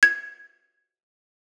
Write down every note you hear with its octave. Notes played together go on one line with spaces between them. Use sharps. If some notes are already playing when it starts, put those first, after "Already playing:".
G#6